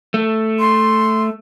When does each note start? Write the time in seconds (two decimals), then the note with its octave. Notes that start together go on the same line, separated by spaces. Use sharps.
0.14 A3
0.60 C6